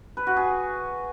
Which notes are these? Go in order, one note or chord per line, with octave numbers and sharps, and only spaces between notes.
B4
F#4
G#4